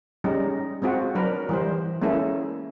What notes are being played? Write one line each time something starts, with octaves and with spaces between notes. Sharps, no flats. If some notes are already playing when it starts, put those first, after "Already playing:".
G3 G#3 C#4 D#4
G#3 C4 F4 F#4
F#3 D4 A#4 B4
E3 G3 C5
G#3 A#3 C#4 E4 A4